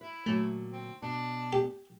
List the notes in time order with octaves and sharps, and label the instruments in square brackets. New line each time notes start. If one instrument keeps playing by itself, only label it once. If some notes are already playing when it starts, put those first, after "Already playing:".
[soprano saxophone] E4 [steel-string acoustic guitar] B4
[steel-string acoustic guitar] A#2 D3 F#3 [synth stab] A3
[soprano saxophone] C4
[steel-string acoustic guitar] B2 B3 [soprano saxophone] D4
[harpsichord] G4